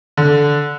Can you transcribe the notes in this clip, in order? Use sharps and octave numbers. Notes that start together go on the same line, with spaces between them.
D3